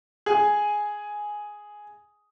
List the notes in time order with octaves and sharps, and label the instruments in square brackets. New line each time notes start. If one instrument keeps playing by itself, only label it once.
[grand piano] G#4 G#5